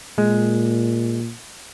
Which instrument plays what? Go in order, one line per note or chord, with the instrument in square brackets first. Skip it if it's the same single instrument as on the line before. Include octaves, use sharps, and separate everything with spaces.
[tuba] A#2 [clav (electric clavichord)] G#3